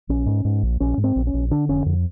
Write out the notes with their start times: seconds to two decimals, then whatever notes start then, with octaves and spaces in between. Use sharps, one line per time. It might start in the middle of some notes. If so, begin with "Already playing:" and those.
0.09 A#1 C#4
0.26 G#2
0.45 G#2
0.63 A#1
0.80 A#1 C#4
0.97 G#2
1.04 C4
1.16 A#1
1.27 C#4
1.34 A#1
1.51 D3 D4
1.69 F1 C#4
1.86 F2